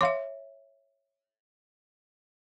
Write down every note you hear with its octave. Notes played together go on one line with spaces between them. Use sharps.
C#5 E5 F5 C6 D6